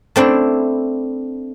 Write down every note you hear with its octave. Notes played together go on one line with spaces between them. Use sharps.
A3 C4 D4 E4